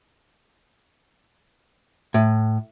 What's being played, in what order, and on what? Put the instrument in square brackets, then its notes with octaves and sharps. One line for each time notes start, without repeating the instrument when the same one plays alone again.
[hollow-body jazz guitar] A2